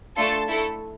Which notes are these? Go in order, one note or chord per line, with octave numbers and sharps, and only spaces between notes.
A3 D4 F4 A4 A5 C6
A3 E4 A4